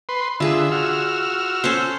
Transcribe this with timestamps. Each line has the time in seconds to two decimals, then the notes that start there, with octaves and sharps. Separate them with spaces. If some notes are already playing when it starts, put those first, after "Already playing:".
0.09 B4 C6
0.40 D3 F4 G#4 E5
0.72 F#4 E6 F6
1.64 C#4 A4 C5